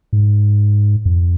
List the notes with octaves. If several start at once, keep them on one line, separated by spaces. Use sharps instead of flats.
G#2
F2